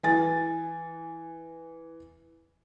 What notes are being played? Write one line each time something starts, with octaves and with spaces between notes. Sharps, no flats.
E3 G#5 A6